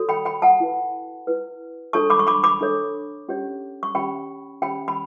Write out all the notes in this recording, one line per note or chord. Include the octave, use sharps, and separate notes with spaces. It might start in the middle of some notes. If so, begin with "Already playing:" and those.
Already playing: F#4 A4 C#5
G5 B5
G5 B5
F#5 A5
E4 B4
E4 B4
D4 A4 C#5 A5 C#6
B5 D6
C#6
B5 D6
B5 D6
D4 A4 C#5
C#4 G4 C#5
C#6
C#4 G4 C#5 G5 B5
C#4 G4 C#5 G5 B5
B5